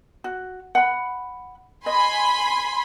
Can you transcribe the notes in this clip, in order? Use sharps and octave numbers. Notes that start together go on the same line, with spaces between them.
F#4
F#5 B5
D#5 G#5 B5 C6